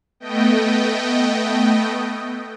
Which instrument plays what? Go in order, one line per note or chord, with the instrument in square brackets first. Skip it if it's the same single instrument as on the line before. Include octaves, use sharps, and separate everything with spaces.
[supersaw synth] A3 B3 D#5 G5